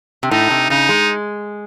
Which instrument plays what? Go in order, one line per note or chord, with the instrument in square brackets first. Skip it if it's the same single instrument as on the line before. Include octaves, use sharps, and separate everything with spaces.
[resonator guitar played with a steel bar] C3
[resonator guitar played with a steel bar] A2 [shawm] D#4
[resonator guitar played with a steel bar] C3
[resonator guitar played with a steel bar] C#3 [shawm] D#4
[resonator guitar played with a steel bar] G#3